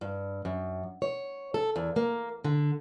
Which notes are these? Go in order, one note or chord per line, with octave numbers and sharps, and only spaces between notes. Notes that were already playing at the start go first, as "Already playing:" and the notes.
G2
F#2
C#5
A4
E2
A#3
D3